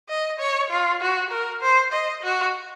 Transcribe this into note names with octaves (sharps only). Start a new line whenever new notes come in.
D#5
C#5
F4
F#4
A#4
C5
D#5
F#4